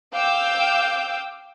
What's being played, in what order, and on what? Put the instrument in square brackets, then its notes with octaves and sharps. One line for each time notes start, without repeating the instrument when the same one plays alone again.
[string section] F5 G5 D6 E6 G6